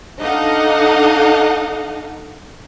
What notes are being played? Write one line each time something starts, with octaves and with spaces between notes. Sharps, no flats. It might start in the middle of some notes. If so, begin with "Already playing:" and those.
D4 D#4 A4 D#5 F5 F#5